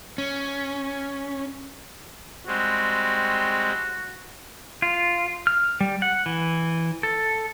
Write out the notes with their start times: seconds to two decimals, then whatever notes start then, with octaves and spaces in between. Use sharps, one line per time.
0.18 C#4
2.47 G3 G#3 C4 F#4
4.82 F4
5.47 F6
5.81 G3
6.02 F#5
6.26 E3
7.03 A4